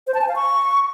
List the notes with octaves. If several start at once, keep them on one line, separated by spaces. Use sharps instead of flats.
C5
A5
G#5
F5
C#6